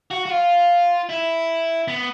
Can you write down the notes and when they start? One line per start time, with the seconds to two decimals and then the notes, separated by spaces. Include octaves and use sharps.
0.11 F#4
0.26 F#4
0.31 F4
1.09 E4
1.88 B3